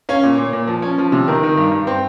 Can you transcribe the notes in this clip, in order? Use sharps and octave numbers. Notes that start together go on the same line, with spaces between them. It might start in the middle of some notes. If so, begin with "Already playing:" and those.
C#4 C#5 F5
A#2
A#2
A#2
F3
C#4
F3
C3
D#3 A#4
D#3
G2
G2
C4